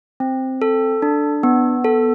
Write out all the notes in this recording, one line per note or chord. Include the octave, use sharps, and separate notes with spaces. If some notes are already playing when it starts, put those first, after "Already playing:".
C4
A4
D4
B3
A4